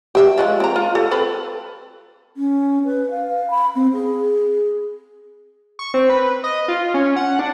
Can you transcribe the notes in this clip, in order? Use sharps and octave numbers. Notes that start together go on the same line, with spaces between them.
G4 E5
F3 G#3 F4
C4 A#5
F4
A4
C4 A4 B4
C#4
B4
F5
B5
C4
G#4
C#6
C4
B4
D#5
F4
C#4
F#5
D4